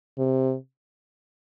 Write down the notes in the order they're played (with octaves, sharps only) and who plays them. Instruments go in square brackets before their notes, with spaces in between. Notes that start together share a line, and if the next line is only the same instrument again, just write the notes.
[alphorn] C3